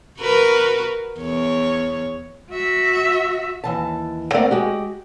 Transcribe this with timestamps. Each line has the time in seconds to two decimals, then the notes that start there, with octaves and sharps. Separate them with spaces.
0.20 F#4 A#4 B4
1.19 E2 C#5
2.51 F#4 E5
3.64 D#2 E3 A5
4.33 A3 A#3 C4 A#4 D5 F#5
4.51 G#3 F#4 G4